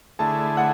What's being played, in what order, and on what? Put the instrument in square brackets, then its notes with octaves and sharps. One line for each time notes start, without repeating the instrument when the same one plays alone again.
[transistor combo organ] D3 A3 E4 G#4 [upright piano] A5
[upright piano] F#5